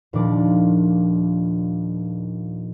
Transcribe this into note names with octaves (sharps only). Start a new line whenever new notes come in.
D#1 A#2 F3 D4 D6